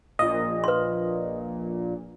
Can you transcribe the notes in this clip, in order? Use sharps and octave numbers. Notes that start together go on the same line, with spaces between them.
A#1 A#2 D#5
B4 C6